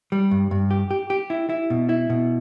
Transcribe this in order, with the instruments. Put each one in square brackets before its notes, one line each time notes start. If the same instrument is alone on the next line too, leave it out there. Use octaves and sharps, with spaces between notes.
[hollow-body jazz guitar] G3
G2
G2
G4
G4
G4
E4
E4
B2
E4
B2